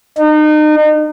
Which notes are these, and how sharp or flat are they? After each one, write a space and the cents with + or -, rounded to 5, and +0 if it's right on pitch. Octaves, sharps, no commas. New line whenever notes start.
D#4 -35